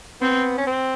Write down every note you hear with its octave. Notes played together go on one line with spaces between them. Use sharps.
B3 C4
C#4
C4